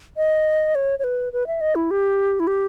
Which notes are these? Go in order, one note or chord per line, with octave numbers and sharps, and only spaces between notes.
D#5
C#5
C#5
B4
B4
E5
D#5
E4
G4
E4
G4